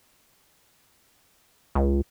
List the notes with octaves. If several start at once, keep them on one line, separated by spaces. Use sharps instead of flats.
C#2